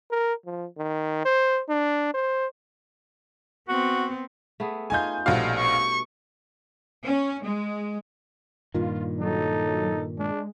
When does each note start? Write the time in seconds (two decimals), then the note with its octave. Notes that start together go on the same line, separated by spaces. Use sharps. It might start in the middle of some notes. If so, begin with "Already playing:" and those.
0.11 A#4
0.46 F3
0.78 D#3
1.25 C5
1.69 D4
2.14 C5
3.69 B3 C4 F#4
4.60 A3 B3 G#4
4.90 C#4 D#4 F4 G#5 G6
5.26 A#1 B2 G3 A3 F#4 F5
5.59 C#6
7.04 C#4
7.43 G#3
8.75 G2 A#2 D#3 F4
9.20 F#3 D#4 A4
10.18 G#3 D4